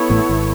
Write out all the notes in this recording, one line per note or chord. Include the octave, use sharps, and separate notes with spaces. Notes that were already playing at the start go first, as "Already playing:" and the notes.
Already playing: B3 E4 A4 C#5
A1 A2
G#1